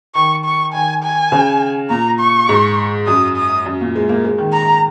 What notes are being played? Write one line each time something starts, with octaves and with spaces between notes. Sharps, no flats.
D#3 C#6
C#6
D#3 G#5
G#5
C#3
A#2 A#5
C#6
G#2
F#2 D#6
D#6
F#2
A#2
G#3
A#3
G#3
D#3
A#5